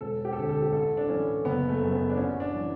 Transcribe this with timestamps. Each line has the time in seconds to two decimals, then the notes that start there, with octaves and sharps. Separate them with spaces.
0.01 E1 A4
0.25 G4
0.33 A4
0.37 D2 D3 G4
0.49 A4
0.62 G4
0.72 A1 A4
0.97 D4
1.08 A2 E3 C#4
1.45 F#1 B3
1.69 A3
1.81 F#2 C#3
1.92 B3
2.10 D4
2.17 A1 C#4
2.40 D4
2.55 E3